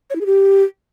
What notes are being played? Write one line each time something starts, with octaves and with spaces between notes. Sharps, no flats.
C#5
E4
G#4
G4